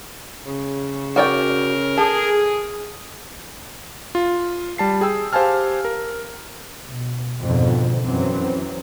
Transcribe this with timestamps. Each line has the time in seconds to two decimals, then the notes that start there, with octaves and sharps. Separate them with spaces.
0.45 C#3
1.16 F#4 A#4 D5 G5
1.98 G#4 A4
4.15 F4
4.78 G3 A5 C7
5.01 G#4 G5 E6
5.33 G4 C5 F5 G#5 A5 F6
5.85 A#4
6.88 B2
7.43 F2 G#2 B2 D3 D#3
8.04 F#2 E3 F#3 C4